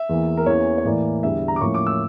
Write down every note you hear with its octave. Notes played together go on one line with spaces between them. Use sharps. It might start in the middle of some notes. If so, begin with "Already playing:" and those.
Already playing: E5
E2 E3 A#3
A#4
E2 E3 A#3 C#4 C#5
C#5
A2 E3 A#3 D5
E2 D3 G3 E5
A#5
D6
A2 F3 A#3 C#4 C#6
D6
E6